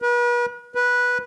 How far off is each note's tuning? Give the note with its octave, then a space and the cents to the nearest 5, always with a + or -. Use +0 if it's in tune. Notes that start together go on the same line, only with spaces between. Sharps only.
B4 -40
B4 -10